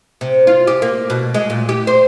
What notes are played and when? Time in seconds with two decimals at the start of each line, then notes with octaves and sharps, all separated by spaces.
0.21 C3
0.47 F4
0.67 G4
0.82 A#3
1.10 B2
1.34 G#3
1.50 A#2
1.69 G4
1.87 C5